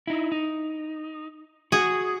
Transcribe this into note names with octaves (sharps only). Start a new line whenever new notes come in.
D#4 E4
D#4
F#4 G#4